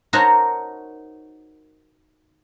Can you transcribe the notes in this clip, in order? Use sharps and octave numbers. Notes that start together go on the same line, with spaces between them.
D#4 F#4 A#4 C5 C#5 A5